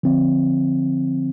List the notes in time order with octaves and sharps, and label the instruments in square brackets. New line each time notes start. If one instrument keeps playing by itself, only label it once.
[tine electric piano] D3 F3 C4